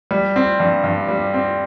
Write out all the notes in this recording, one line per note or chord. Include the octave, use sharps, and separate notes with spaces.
G3
C4
G2
G2
G3
C4